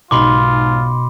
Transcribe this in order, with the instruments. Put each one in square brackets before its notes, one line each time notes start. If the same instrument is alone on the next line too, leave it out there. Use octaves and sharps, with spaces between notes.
[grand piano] B1 G#2 [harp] B2 [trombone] F4 [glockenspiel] B5 C6 D6